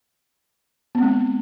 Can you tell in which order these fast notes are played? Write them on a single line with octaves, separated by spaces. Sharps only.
B3 C4 G#3